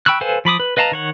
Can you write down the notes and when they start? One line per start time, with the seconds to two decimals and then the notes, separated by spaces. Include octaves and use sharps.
0.06 G5 B5 C#6 E6 F#6
0.21 A4 B4 C5 F5 G#5
0.45 F3 B5 D6 D#6
0.60 B4
0.77 B4 D#5 F5 A5 A#5
0.92 D#3 C#5 F#5